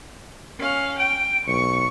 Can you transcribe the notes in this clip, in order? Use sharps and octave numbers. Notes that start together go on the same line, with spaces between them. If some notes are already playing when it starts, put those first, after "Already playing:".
C#4 F5
G5 D7
B1 C#6 C#7